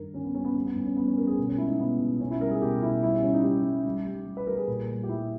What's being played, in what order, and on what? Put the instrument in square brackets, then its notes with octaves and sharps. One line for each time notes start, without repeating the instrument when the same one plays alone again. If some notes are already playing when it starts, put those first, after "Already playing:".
Already playing: [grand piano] G2 D#3 A#4
D#3 C#4
B3
G3 C#4
B3
G3 B3
B3
G2 C#4
C#4
G3 B3
C#4
G3 A#4
G#4
B2
C#4
G#3 E4
D#4
B2 B3
B2
B2 C#4
E4
G3 A#4
G#4
B2 G4
B2 E4
G3 E4
C#4
G3 C#4
D#4
G3 G4
G3
G3
G3
G3
B4
G3 A#4
G#4
A#2
G3
G4
G3 E4